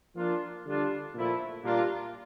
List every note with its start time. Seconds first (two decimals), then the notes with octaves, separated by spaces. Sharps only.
0.16 F3 A#3 D4 F4
0.65 D3 G3 D4 F4
1.15 A#2 F3 A3 E4
1.63 A#2 G3 A#3 D4 F4